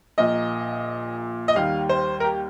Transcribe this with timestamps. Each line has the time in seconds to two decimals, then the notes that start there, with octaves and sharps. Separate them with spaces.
0.18 A#1 A#2 F3 A#3 D#5
1.48 D#5
1.55 D#2 D#3 G3 F5
1.89 C5
2.20 A#4
2.24 G4